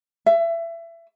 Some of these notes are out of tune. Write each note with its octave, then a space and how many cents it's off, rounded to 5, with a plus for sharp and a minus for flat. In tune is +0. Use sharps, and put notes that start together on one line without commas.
E5 +25